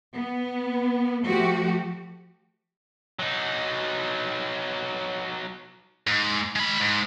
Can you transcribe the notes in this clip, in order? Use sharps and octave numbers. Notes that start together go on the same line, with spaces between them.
B3
F3 A3 F#4 G4
F#3 D#4
G#2
G#3 B5
G#2